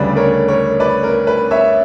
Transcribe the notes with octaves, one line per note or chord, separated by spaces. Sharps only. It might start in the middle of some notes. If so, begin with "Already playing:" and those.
Already playing: D2 C#3 G3 B4 D5
A#4 C#5
A#4 C#5
B4 D5
A#4
B4
C#5 E5